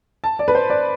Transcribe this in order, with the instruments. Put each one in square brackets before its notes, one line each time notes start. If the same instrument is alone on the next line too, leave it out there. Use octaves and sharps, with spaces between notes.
[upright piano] A5
D5
B4
C5
D5